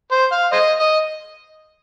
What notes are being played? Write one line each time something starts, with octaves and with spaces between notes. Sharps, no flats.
C5
F5
C5 D#5
D#5